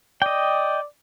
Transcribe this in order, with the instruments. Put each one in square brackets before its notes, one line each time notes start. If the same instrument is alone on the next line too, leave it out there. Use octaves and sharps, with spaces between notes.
[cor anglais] D5 [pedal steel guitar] D#5 G5